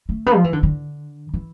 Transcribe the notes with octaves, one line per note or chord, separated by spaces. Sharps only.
A3
B3
F3
E3
D3
D3
E3